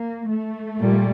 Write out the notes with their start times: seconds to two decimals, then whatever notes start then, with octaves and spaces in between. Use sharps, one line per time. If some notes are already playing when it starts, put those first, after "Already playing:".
Already playing: A#3
0.28 A3
0.78 A#2 G3